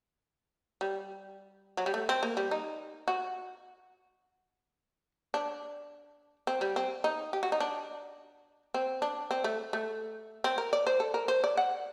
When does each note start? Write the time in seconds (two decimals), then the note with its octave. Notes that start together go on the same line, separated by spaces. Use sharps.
0.81 G3
1.77 F#3
1.86 G3
1.94 A3
2.09 C4
2.23 A#3
2.37 G3
2.51 D#4
3.08 F#4
5.34 D4
6.47 C4
6.61 G3
6.76 C4
7.04 D#4
7.33 G4
7.43 F#4
7.52 D#4
7.60 D4
8.74 C4
9.02 D4
9.31 C4
9.44 A3
9.73 A3
10.44 C4
10.58 A#4
10.73 D5
10.87 C5
11.00 A4
11.14 A#4
11.28 C5
11.44 D5
11.57 F#5